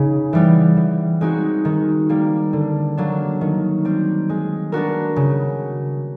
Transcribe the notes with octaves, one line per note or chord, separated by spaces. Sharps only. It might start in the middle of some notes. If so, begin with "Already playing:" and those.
Already playing: C#3 D#4 G#4
E3 G3 B3
E3
G#3 C4 D#4 F#4
D#3
G3 A#3
D3
F#3 A#3 D4
D#3
G3 C4
G#3
B3 D4 F#4 A#4
C#3